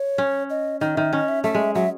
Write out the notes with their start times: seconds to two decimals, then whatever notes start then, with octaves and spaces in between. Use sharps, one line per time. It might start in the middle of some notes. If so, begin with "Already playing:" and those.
Already playing: C#5
0.18 C#4
0.50 D#5
0.81 D#3 D#5
0.97 D#3 E5
1.13 C#4 D#5
1.28 E5
1.44 A3 E5
1.55 G#3
1.75 F#3 E5